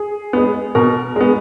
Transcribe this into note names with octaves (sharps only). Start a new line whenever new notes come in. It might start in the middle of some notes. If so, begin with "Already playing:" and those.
Already playing: G#4
G#3 B3
B2 A#4
G#3 B3